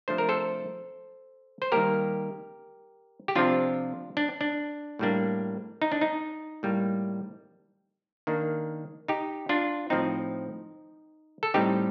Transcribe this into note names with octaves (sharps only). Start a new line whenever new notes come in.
C3 F3 A3 D4 C5
A#4
A4 C5
C5
D#3 G3 A#3 G4 A#4
G4
C3 F3 C4 D4 F4
D4
D4
A2 G3 A#3 D4
D#4
D4
D#4
A2 G3 A#3
D#3 A#3 D4
D#4 G4
D4 F4
A2 F3 C4 D#4
A4
A2 G3 C4 D#4 G4